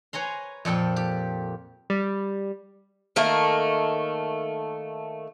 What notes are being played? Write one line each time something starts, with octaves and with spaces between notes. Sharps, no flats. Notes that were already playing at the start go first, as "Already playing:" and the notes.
B4 C#5 G#5 A#5 C6
F2 A#2 A4 G5
G4
G3
D#3 A3 A#3